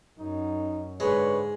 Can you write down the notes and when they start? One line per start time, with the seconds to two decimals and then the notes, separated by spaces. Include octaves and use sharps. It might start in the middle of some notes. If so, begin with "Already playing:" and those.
0.19 F#2 D#4
1.00 G#2 D3 G#3 B4 C#5